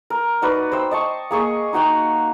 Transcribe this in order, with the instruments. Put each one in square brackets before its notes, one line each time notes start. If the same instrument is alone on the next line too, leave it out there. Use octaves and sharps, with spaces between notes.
[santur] A#4
D#4 F#4 B4 D5
C5 G5 E6
D#5 A5 C#6
A#3 G#4 C#6
D#4 F#4 G5 A#5